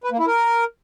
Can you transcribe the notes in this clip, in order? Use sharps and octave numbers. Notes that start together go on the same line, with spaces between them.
B4
A#3
E4
A#4